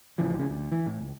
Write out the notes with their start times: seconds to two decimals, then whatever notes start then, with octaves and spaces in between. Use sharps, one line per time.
0.18 A1 C#3 E3 F3
0.36 D2 C#3
0.50 D2
0.72 E3
0.86 A2
1.01 C#2